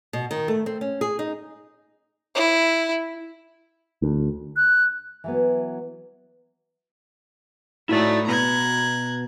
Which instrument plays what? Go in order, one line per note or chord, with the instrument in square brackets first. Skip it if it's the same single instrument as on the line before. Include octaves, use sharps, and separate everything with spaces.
[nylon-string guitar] B2
D#3
A3
C4
C#4
G#4
D#4
[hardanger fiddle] E4
[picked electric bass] D2
[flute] F#6
[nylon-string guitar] E3 F#3 B3
[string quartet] A2 A3 D#4 [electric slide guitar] E4 F#4 D5
[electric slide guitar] B2 B3 [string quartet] A#5 F#6 G#6